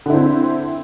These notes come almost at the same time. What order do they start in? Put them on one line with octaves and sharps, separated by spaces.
D3 E4 C4